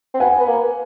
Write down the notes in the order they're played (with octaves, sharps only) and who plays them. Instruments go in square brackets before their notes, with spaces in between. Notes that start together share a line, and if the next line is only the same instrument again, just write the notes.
[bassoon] C4
[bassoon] B3 [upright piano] F#5 G#5
[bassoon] B3
A#3